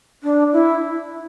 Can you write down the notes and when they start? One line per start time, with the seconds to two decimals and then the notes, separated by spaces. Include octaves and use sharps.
0.23 D4
0.52 E4